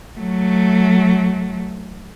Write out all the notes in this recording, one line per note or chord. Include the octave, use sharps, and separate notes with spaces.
F#3 A3